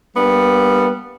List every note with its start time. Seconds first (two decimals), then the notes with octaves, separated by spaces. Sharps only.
0.16 G3 A#3 B3 D4